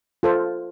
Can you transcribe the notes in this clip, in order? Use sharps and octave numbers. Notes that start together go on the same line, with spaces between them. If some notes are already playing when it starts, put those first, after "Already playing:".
F4 A4 C5